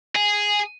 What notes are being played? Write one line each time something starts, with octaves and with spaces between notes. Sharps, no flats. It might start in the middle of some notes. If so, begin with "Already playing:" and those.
G#4